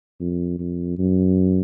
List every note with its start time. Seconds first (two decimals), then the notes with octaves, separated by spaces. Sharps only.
0.20 F2
0.59 F2
0.98 F#2